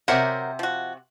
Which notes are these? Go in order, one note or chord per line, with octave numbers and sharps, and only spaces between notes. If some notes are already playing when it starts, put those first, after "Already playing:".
C3 F#3 A#4 C5 E5 F#5
F3 F#4